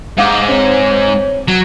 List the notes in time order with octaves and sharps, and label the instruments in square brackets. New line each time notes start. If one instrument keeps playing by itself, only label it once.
[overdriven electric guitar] G#2 [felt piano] F5 F#5 D6
[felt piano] C4 [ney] C#5
[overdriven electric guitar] F#3